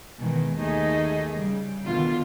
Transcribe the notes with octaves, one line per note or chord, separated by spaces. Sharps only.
B2 D#3 E3 G#3
D#2 A3 D#4 G#4 D#5
C#3 G3
D2 B2 D3 D#3 F4